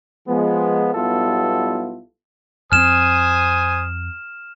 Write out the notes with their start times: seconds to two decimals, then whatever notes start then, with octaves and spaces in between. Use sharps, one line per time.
0.28 F3 G#3 B3
0.94 B1 G3 B3 E4 F4 A4
2.72 F2 C4 C5 G#5 D#6 F6 E7